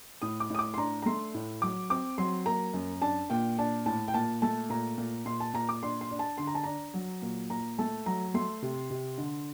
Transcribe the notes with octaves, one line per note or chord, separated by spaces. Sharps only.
A2 D#6
D6
A2 D#6
D6
C6
D4 A#5
A#5
A3 C6
A2
F#3 D6
C4 D6
F#3 C6
A#3 A#5
F#2
D4 A5
A#2 G5
D4 A5
A2 A5
G5
A#2 A5
A3 A5
A#2 A#5
A#2
A#2 C6
A5
A#2 A#5
D6
D4 C6
C6
D4
A5
D3 C6
A#5
A5
D4 A#5
F#3
A#2
A#2 A#5
A3 A5
F#3 A#5
A3 C6
C3
C3
D3